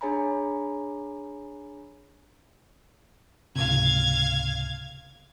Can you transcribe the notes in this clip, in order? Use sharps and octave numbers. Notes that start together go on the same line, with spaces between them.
D4 G#4 C#5 G#5 A#5 B5
C#2 G#2 C3 F5 G#6